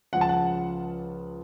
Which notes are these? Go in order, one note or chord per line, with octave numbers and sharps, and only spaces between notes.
C#2 C#3 F3 F#5
A5
F#5